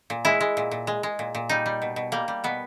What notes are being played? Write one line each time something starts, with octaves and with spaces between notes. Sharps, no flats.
A#2
G#3 E4
G#3
A#2
A#2
G#3
G#3
A#2
A#2
G3 D#4
G3
B2
B2
G3 A#3
G3
B2 B3